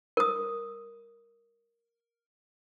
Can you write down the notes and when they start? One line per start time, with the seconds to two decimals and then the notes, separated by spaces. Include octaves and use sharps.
0.17 A#4 D#6